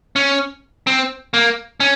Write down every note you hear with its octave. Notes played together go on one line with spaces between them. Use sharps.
C#4
C4
A#3
C#4